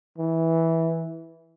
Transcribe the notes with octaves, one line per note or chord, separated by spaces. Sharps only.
E3